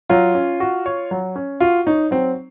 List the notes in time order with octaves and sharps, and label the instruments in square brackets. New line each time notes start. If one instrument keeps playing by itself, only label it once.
[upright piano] F#3 [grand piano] F4
[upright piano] C#4
F#4
C#5
F#3
C#4
[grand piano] F4 [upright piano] F#4
[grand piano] D#4 [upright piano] C#5
[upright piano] F#3 [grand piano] C4